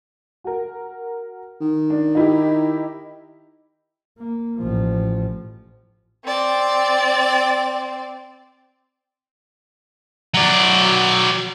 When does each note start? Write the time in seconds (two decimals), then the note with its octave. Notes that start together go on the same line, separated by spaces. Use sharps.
0.44 F#4 A#4
1.60 D#3
1.90 D4
2.15 D#4 E4 G4
4.18 A#3
4.57 A1 F3
6.25 C4 D5
10.34 F#3 D5